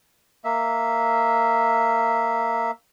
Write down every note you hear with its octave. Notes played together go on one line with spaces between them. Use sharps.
A#3 E5